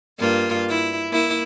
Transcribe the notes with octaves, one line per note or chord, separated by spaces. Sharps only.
G2 A#3 F4
E4
A#3 E4